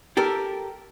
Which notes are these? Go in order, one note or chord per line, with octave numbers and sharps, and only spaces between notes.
G4 A4 A#4